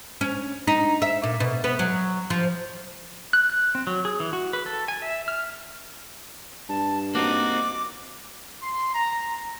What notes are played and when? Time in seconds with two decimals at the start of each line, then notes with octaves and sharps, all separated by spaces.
0.21 C#4
0.67 D#4
1.02 E5
1.23 A#2
1.40 B2
1.64 B3
1.79 F#3
2.30 F3
3.33 F#6
3.50 F#6
3.75 C4
3.87 F#3
4.05 G#4
4.20 E3
4.33 F#4
4.53 B4
4.66 A4
4.88 G#5
5.02 E5
5.28 F6
6.69 G2 A5
7.15 A#3 C4 D#4 F#4 D6
8.62 C6
8.94 A#5